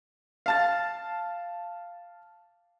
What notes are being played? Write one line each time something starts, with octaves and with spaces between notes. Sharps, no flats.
F5 A5 A6